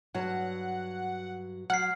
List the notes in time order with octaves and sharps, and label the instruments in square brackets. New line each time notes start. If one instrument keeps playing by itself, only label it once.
[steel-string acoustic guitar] G2 F#3 [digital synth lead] F#5
[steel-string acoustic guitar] F#3 [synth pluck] F#5 [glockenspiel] F6 C7